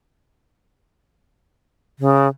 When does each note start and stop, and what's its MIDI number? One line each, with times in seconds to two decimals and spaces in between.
1.99 2.28 49